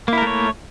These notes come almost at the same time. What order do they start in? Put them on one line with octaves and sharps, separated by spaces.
A#3 E4 A#4 A3 C#5